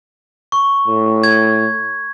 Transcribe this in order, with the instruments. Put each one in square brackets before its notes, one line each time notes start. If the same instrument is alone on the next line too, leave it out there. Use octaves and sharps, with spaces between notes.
[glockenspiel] C#6
[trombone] A2
[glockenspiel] G#6